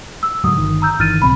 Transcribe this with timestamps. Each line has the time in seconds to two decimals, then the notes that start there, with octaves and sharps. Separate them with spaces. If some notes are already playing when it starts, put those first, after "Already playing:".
0.23 E6
0.44 G#2 D3 F#3 D#6
0.58 G1 D#3
0.82 A#5 E6 G6
1.00 G1 D#3 E3 F6 A6 D#7
1.22 D1 C2 C4 B5